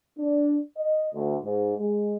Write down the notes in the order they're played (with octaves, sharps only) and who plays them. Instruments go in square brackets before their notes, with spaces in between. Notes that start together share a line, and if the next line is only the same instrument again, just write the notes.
[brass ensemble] D4
D#5
D2
G#2
G#3